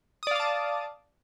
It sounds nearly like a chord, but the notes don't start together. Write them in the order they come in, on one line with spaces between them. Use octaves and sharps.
D#6 D5 F5 D6 A5